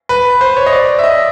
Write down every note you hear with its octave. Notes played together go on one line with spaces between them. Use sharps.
B4
C5
C#5
D#5
D5
E5
D#5